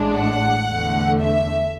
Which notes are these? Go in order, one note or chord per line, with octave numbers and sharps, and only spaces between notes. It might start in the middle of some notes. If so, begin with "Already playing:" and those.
Already playing: A1 A2 G#3 D4
F#5
E2 D3 A3
E5